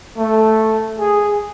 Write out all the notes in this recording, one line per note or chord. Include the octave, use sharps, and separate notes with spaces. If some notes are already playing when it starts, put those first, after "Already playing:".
A3
G#4